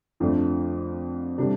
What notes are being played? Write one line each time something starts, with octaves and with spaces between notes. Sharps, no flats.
F2 D3 F3 A3 D4
C3 G3 D4 A4